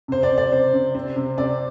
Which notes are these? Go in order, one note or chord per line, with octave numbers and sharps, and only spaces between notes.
C3 C5
D5
C3
D5
C3 C5
C3
C4
C3
C3 D5